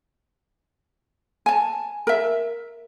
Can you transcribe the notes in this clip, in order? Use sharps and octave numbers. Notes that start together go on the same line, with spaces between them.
G#5 A5
A#4 E5